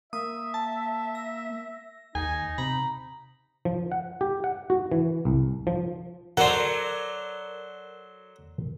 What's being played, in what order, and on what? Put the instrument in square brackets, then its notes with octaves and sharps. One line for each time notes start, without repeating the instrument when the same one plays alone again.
[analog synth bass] A#3 [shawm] E5 [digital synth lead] D#6
[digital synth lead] A5
A#6
[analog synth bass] D#2 [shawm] D#4 [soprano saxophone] G#5
[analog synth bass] C3 [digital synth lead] A#5 [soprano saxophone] B5
[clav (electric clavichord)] F3
F#5
G4
F#5
F#4
E3
C2
F3
[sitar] F#3 D5 [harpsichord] A4 C5 [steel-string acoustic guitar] A#4 [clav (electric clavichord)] F#5